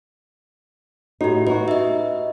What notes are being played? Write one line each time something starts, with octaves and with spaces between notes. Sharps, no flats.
A2 D#4 F#4 G4
D#4 F#4 B4
D#5 E5